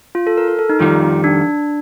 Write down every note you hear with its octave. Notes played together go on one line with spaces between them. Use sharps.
F4
A4
A#4
A#4
A4
D#4
F2 D#3 G3 F4
D4